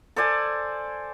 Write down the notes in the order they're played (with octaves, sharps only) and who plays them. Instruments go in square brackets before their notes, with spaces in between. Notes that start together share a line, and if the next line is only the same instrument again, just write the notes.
[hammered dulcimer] A4 C5 D5 G#5